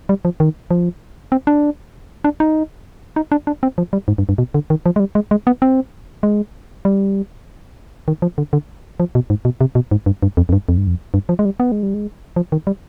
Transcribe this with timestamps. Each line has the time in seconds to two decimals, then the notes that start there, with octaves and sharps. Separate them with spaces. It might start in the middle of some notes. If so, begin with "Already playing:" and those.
0.09 G3
0.25 F3
0.40 D#3
0.71 F3
1.32 C4
1.47 D4
2.24 D4
2.40 D#4
3.16 D#4
3.32 D4
3.47 D4
3.63 C4
3.78 F3
3.93 G3
4.08 G#2
4.18 G2
4.29 G2
4.38 B2
4.54 D3
4.70 D#3
4.86 F3
4.96 G#3
5.00 G3
5.15 G#3
5.31 G#3
5.47 B3
5.62 C4
6.23 G#3
6.85 G3
8.08 D#3
8.22 F3
8.38 D3
8.53 D3
9.00 F3
9.15 B2
9.30 G#2
9.45 B2
9.61 C3
9.75 B2
9.91 G#2
10.06 G2
10.23 G2
10.37 F2
10.49 F2
10.53 G2
10.69 F2
10.77 G2
10.87 F2
11.14 G2
11.29 F3
11.39 G#3
11.45 G3
11.60 B3
11.72 G#3
11.83 G3
11.94 G#3
12.36 F3
12.52 D#3
12.67 G3